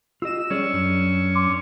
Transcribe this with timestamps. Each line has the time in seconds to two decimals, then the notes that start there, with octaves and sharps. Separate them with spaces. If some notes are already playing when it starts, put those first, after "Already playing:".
0.22 F4 G4 D#5 E6 E7
0.50 G3 C#4 G#4 D5
0.71 F#2 D4
1.35 C6 D6